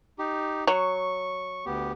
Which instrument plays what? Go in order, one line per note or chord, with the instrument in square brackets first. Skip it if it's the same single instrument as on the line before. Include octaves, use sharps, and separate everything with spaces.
[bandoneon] D#4 G4
[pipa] F#3 [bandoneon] C#6
[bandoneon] D2 B3 G4